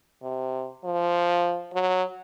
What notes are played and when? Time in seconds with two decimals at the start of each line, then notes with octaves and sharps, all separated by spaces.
0.23 C3
0.84 F3
1.73 F#3